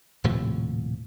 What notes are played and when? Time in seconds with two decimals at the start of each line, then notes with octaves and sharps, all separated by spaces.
0.24 D#1 A2 C3 F3